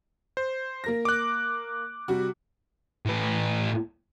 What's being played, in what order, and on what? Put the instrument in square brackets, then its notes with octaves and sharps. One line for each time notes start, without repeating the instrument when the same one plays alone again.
[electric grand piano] C5
[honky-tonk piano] A#3 A#4 A#6
[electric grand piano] D6 F#6
[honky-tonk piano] C3 G3 F#4
[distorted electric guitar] A2 B4